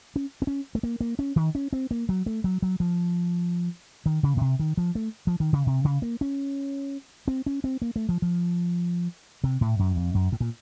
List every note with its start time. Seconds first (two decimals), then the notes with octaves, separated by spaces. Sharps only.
0.16 C#4
0.42 C4
0.47 C#4
0.75 A3
0.83 A#3
1.01 A#3
1.19 C#4
1.36 D#3
1.55 C#4
1.73 C4
1.91 A#3
2.09 F#3
2.26 A3
2.44 F#3
2.62 F#3
2.80 F3
4.06 D#3
4.23 C#3
4.37 A#2
4.41 C3
4.59 D#3
4.77 F3
4.95 A3
5.27 F3
5.40 D#3
5.53 C#3
5.67 C3
5.85 C#3
6.02 A#3
6.21 C#4
7.28 C4
7.46 C#4
7.64 C4
7.82 A#3
7.96 A3
8.09 F3
8.22 F3
9.44 C3
9.61 A2
9.79 F#2
9.97 F2
10.15 F#2
10.32 A2
10.40 A#2